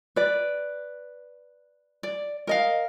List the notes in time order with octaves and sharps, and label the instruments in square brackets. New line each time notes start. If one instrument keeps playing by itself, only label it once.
[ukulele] B4 D5
D5
A#4 D#5 F5